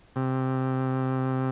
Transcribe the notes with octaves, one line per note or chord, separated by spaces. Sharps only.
C3